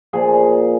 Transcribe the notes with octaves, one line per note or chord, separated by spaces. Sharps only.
A#2 F3 G#4